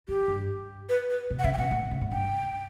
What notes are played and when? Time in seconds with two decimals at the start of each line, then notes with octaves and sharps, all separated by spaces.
0.08 E3 G4
0.28 G2
0.89 B4
1.10 B4
1.30 B2
1.39 F#5
1.44 C#3 E5
1.53 G5
1.58 B2 F#5
1.71 A2
1.91 C#3
2.01 A2
2.11 G2 G5